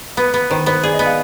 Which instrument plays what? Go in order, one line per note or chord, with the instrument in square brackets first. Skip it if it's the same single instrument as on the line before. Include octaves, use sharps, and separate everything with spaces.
[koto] B3 [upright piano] B4
[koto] B3
[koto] D#3 [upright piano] C5
[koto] B3 [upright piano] C5
[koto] G#4 [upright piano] D5
[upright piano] D#5
[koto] B3
[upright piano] F5